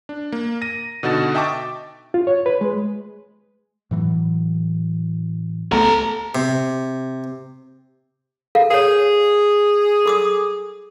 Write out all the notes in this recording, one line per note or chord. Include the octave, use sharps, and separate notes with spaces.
D4
A#3
A#6 D#7
B2 D3 D#4 F#4 A6 E7
D#5 E5 G5 A5 C#6 D6
F4
C#5
B4
G#3
A2 E3 F#3
C#2 A3 B3 A4 A#5
C3
A4 A#4 F5
G#4 A#4 C#5
A4 D6 D#6